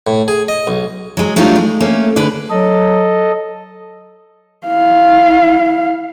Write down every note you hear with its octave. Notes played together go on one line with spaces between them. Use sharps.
A2
G#4
D#5
B1
F#3 G#3
F#3 G3 A3 D4 D#4 F4
G#3
A3 A#3 C#4
D3 G#4 B4 D5
F#3 A4 D#5
E4 F5